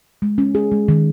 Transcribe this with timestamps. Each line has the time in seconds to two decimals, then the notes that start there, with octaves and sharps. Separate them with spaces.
0.22 G#3
0.38 C#4
0.55 G#4
0.72 G#3
0.88 D#3